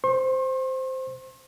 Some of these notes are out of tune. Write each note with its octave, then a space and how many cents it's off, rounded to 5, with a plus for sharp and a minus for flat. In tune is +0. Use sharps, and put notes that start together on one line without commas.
C5 -5 C6 +45